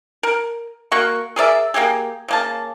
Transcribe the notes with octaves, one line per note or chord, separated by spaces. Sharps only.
A#4
A#3 F#4 A#4 C#6
G#4 A#4 D5 E5
A#3 D#4 G4 G#4
C#3 A#3 A5